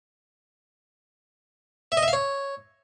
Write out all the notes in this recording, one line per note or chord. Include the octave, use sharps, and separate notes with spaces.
E5
D#5
E5
F5
C#5